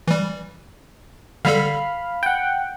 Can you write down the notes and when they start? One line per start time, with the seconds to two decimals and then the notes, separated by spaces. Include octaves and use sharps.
0.08 E3 G3
1.45 D3 G3 A4 F5 B5 F6
2.23 F#5 G5